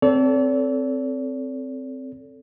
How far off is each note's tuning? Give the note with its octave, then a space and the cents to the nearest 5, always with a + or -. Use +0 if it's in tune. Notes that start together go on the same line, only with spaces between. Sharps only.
C4 +0 A4 +0 D5 -45